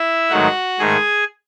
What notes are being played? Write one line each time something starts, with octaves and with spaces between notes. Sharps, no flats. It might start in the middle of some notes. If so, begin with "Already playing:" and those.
Already playing: E4 E5
G#2 D#3 F#3 A3 D#4 F#4 F#5
G#2 D#3 A3 G#4 G#5